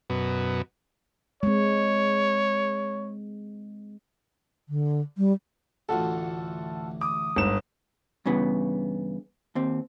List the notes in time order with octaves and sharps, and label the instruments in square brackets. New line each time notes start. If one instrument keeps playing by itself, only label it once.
[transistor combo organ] F#2 B2
[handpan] G#3 C4 [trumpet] C#5
[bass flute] D3
G3
[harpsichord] A1 D2 [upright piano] F4 F#4 A4
[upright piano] D6 [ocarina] D#6
[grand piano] G1 E7 [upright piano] G#2
[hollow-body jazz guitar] G2 C#3 E3 B3
D#2 C4